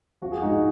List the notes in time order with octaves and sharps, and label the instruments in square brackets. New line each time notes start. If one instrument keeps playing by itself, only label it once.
[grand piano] F3 F#4
G#4
G#2 D#4 F#4